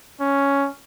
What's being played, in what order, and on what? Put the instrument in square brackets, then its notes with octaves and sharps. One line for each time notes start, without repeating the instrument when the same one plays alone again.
[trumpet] C#4